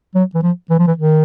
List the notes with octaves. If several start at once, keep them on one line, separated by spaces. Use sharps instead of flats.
F#3
E3
F3
E3
F3
E3
D#3